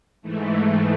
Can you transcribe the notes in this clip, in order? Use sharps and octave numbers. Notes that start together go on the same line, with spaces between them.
G#2 E3 A3